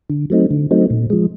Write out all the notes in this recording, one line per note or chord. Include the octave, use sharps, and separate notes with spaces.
D3
F#3 A3 C4 D#4
D3
F#3 A3 C4 D#4
A#2
F3 G#3